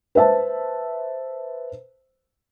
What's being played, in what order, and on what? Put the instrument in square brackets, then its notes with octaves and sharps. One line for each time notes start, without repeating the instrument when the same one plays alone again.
[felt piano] B4 C5 E5 A5